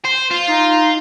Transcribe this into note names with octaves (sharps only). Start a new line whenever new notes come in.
C5
F4
D#4